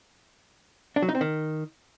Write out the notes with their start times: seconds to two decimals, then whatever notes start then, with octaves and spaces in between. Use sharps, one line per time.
0.96 D4
1.02 F#3
1.09 D#4
1.15 C4
1.21 D#3